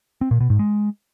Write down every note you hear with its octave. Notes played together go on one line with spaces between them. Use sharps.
C4
A#2
B2
G#2
G#3